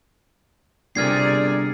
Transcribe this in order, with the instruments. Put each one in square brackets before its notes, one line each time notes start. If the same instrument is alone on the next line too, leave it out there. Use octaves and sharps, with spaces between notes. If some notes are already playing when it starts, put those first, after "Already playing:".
[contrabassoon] G1 [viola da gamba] C3 G#4 A#4 [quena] D5 [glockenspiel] F6 G#6 C7